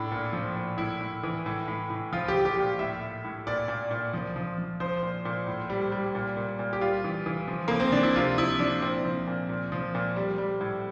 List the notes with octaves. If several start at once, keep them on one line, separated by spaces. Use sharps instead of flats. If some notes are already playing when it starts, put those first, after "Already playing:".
Already playing: A2 D4
A#2
F3
A#2
A2 E4
A2
E3
A2
A2
A2
F3 F4
G4
F3
G4
A#2
A2 E5
A2
A2
A#2 D5
A#2
A#2
F3
F3
F3
F3 C5
A#2
A#2
A2
G3
G3
A#2
A#2
A#2
G4
G3 F4
E3
E3
F3
F3 A#3
C4
F3 D4
E4
C3 F4
F3 E4
F3 D4
A#2 C4
F3
A#2
A#2
F3
A#2
G3
G3
A2